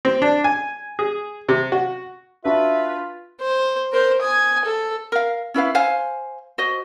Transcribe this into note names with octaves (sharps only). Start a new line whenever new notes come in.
C4
D4
G#5
G#4
C3
F#4
D4 F4 F#4 B4 E5
C5
A#4 C5
G#5 D#6
A4
A#4 F5
C#4 E4 B4 F5
C5 F5 G#5
F#4 C5 D#5